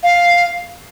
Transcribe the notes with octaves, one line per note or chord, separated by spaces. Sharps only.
F5